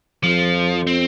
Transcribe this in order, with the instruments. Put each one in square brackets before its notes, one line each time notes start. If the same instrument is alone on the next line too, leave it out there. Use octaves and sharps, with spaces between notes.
[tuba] F2 [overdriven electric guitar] F3
[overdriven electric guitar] C4